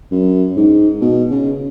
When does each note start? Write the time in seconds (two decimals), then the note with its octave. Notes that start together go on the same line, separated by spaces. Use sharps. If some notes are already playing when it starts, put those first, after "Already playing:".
0.11 F#2
0.56 G#2
1.01 B2
1.31 C#3